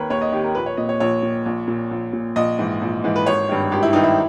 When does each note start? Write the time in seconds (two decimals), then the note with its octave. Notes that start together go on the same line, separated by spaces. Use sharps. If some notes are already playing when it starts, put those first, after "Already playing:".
Already playing: D#2 D#3 A#4 B4 C#5
0.10 D#2 C#5
0.21 D#5
0.32 D#3 G4
0.44 A#4
0.55 A#1 B4
0.66 C#5
0.77 A#2 D#5
0.89 C#5
1.00 A#1 C#5
1.23 A#2
1.46 A#1
1.68 A#2
1.91 A#1
2.13 A#2
2.36 A#1 D#5
2.59 G#2 E3
2.81 A#1
3.04 G#2 E3
3.16 B4
3.26 G#1 C#5
3.49 G2 D#3
3.72 G#1 G4
3.83 E4
3.93 G2 D#3 D#4
4.03 E4